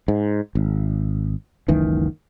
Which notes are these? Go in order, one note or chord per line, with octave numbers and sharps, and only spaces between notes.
G#2
G#1
F#1 C#2 D#3 E3